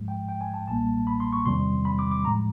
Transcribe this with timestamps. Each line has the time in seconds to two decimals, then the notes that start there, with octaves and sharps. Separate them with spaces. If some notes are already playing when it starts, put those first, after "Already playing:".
Already playing: G#2 F3 G#3
0.08 G5
0.29 G5
0.41 G#5
0.54 A5
0.67 B1 A#2 G3 A#3 A5
1.07 B5
1.20 C6
1.33 C#6
1.46 E2 C3 D#3 G3 C4 C6
1.85 B5
1.99 D6
2.11 D6
2.25 A2 F3 G#3 A#5